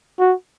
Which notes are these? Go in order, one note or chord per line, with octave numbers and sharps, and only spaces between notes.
F#4